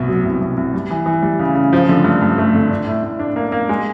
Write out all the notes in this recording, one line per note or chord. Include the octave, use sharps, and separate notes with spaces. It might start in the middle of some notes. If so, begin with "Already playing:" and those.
Already playing: C2 B2
F#3
C2
C2
C2
G3
E3
E3
G3
C#3
C#3
F3
D3
G2
G2
A3
D3
D4
A2
A2
D4
A#3
A#3
G#3